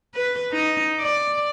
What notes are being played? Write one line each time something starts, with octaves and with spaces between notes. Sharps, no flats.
B4
D#4
D5